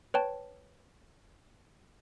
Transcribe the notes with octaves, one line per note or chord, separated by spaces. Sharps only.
B4 C#5 G5 A5